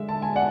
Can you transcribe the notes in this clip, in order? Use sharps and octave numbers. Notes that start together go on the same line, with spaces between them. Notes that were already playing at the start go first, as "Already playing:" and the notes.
Already playing: D3 G#3 E5
A5
G#5
D5 F#5